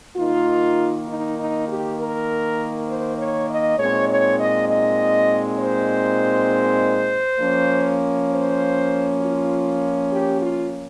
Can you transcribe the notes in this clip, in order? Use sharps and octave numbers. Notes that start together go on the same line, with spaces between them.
D#3 A#3 D#4 F4
D#4
D#4
G4
A#4
C5
C#5
D#5
A#2 G#3 C4 D#4 C#5
C#5
D#5
D#5
C5
F3 A#3 C#4
C5
F4
G4
F4